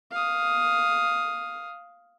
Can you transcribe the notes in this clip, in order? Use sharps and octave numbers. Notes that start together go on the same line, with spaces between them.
F5 D#6